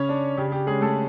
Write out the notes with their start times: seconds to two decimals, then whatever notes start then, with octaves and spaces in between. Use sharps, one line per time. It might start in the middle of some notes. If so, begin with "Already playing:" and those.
Already playing: C#3 C#4 C#5
0.09 D4
0.37 C#3 G4
0.52 G4
0.67 G#3 C#4 G#4
0.81 A3 A4